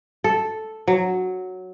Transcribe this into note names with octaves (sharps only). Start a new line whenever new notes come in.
A4
F#3